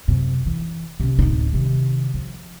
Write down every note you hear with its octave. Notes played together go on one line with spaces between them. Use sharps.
F#2 C3
E3
C3 C#4
D1 D#4
C3 D#3
F3